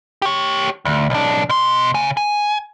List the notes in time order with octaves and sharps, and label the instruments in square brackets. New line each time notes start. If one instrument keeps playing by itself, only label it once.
[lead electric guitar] G4 C#5
D2
B1 D4
B2 C6
C#3 G#5
G#5